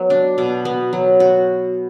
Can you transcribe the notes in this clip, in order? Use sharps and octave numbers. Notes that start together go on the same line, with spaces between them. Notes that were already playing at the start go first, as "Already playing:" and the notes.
Already playing: F#3 B3
D4
B2
B3
F#3
F#4